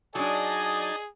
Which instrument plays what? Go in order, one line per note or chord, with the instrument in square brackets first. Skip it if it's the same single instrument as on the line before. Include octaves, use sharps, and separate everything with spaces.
[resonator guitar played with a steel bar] F#3 D4 [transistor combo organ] D#4 A5 [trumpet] G#4 [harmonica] D5 D#5 G#5